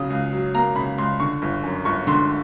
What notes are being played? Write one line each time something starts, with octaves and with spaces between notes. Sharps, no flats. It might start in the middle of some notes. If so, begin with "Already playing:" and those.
Already playing: C#3 F#3 D#6
C#2
F#3
A#3 A#5
C#3 B5
C#2 C6
D3 C#6
G1
F#2
G1 C#6
D3 C6